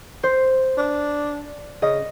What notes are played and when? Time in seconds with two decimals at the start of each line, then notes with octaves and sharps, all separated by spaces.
0.23 C5
0.77 D4
1.82 C#3 D#5